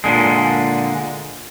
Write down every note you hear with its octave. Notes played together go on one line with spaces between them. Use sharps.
A#2 D3 G#3